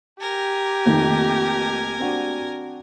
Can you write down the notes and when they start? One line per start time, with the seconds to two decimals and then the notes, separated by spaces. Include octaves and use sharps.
0.21 G4 A#4 G#5
0.85 F1 F2 D#3 A3 A#3
1.99 C4 D4 F#4